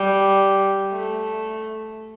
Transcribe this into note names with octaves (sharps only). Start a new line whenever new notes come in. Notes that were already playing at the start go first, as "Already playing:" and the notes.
Already playing: G3
A3